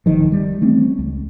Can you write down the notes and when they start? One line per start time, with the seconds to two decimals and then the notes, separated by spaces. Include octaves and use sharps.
0.06 D1 D3 D#3 F3
0.32 G3
0.61 E3 A3 C4 C#4
0.99 C#2